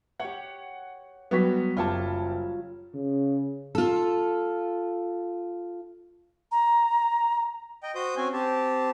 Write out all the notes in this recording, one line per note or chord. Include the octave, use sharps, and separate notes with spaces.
G4 C#5 F#5
F#3 G3 B3 F#4 B6
F#1 F4 G4 C#5 A5
C#3
F4 A4
A#5
D#5 G5
F#4 C5 D#6 G6
C4 C#4 F#4 G#5
C4 G4 A5